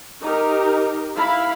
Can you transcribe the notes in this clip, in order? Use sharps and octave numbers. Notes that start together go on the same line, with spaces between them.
D#4 G4 A#4
E4 F5 B5